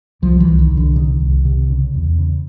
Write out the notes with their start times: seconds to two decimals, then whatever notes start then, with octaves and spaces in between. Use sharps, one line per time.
0.22 C2 F3
0.40 E3
0.47 C2
0.59 D#3
0.72 C2
0.77 D3
0.95 C3 D#3
1.20 C2
1.45 C3
1.70 C#3
1.95 E2
2.18 C#3